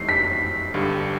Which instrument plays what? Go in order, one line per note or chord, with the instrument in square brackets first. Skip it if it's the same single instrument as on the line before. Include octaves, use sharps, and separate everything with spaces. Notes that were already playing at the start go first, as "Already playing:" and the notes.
Already playing: [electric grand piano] G2 E3 A3 C4 D#4 [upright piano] C7
[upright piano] B6
[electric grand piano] G1 G2 D3 G3